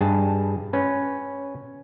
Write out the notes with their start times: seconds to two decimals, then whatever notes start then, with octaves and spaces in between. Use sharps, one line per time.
0.01 G2 G#4 A5
0.73 C#4 B4